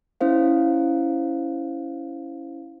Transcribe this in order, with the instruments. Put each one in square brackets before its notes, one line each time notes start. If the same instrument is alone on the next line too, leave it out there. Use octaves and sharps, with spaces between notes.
[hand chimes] C#4 E4 C5 F5